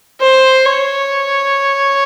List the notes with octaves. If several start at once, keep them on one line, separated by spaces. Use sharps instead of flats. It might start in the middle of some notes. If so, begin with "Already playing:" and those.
C5
C#5